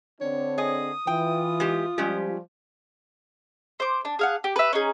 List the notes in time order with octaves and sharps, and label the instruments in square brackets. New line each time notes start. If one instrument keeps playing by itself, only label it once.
[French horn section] D3 C4 D4 [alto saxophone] C#5
[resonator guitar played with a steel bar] G#4 D#5 [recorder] D#6
[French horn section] E3 [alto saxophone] F4 [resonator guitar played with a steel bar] G5
[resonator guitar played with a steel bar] G#3 G4
[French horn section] F3 G3 [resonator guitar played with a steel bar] G#3 C#4 G4
[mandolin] C5 D6
D4
G#4 F5 F#5
G4
B4 E5
C#4 D#4 G#4